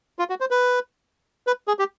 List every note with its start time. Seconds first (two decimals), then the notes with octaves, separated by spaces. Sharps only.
0.19 F4
0.30 F#4
0.40 C5
0.51 B4
1.47 B4
1.68 G#4
1.79 G4